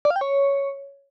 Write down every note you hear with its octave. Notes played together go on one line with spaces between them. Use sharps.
D5
F5
G5
C#5